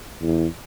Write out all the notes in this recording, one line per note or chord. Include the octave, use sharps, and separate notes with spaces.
E2